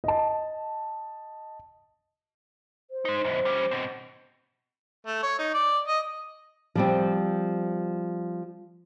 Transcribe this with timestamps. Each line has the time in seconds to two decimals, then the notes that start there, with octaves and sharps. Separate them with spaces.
0.04 D#5 A5
2.91 C5
3.05 G#3 D#4
3.24 B1 F#2 C5
3.45 G3 C#4
3.71 B2 C4
5.06 A3
5.23 C#5
5.39 D#4
5.54 D5
5.88 D#5
6.75 F3 G3 C4